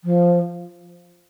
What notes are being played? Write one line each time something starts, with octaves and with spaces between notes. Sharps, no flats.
F3